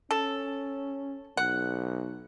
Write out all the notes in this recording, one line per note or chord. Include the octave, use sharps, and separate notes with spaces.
C#4 A4
B1 F#5